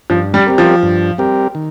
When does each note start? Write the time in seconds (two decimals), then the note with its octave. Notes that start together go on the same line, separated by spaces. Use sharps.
0.10 G2 F3
0.34 G3
0.46 G3 C4 G4 A#4
0.58 F3
0.83 G2
1.18 G3 C4 G4 A#4
1.55 D#3